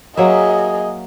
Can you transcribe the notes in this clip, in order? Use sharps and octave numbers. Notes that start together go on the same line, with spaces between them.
F#3 A#3 G#4 D#5 E5